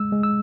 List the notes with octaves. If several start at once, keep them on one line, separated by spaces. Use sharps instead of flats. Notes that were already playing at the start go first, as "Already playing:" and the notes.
Already playing: G#3 E6
G#3
E6